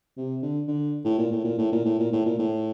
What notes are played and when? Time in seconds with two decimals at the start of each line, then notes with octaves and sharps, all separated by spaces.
0.18 C3
0.42 D3
0.68 D3
1.05 A2
1.18 A#2
1.31 A2
1.44 A#2
1.58 A2
1.72 A#2
1.85 A2
1.99 A#2
2.12 A2
2.26 A#2
2.39 A2